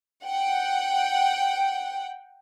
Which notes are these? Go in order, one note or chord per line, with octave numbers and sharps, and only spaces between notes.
F#5 G5